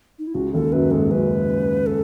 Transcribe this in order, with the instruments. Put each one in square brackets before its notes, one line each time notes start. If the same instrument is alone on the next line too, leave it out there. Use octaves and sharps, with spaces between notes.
[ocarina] D#4
E4
[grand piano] C#2 C#3 [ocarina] F#4
[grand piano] D#2 D#3 [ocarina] A4
[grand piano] F#2 F#3 [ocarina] B4
[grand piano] G#2 G#3 [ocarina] A4
[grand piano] F#2 F#3 [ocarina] B4
[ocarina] A4